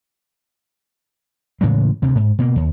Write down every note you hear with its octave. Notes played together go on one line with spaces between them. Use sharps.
A2 C#3 E3 G#3
D2 C3
G#2
B2 A#3
D#2